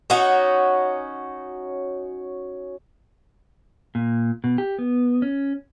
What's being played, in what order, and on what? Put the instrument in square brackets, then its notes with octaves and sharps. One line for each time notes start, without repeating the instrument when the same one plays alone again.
[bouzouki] C#4 D#4 F#4
[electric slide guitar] A#2
B2
G4
B3
C#4